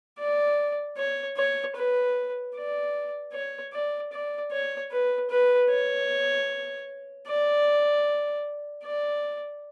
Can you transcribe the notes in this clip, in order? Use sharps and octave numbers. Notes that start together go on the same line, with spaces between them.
D5
C#5
C#5
B4
D5
C#5
D5
D5
C#5
B4
B4
C#5
D5
D5